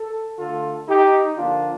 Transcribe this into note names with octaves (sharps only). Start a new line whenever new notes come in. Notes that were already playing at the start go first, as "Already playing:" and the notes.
Already playing: A4
D3 A3 F4 A4
D#4 G4
D3 F3 A#3 D4 F4